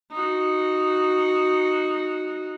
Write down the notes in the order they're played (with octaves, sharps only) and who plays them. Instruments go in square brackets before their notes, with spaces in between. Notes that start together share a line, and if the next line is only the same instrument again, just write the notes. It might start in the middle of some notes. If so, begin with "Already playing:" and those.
[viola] D#4 F#4